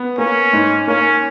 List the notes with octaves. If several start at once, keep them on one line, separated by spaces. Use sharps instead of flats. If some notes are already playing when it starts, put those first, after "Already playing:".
Already playing: B3
A#3 C#4
G#2
A#3 C#4